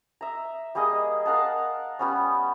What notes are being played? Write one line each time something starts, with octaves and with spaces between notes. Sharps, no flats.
E5 A#5
G3 A#3 G#4 D#5
A#4 F5 F#5 A5
G3 B3 C#4